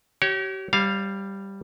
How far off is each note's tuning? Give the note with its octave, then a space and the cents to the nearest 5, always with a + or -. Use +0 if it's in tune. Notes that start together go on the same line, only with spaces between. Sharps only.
G4 -40 C#5 +0
G3 +0 C#5 -35 F5 +0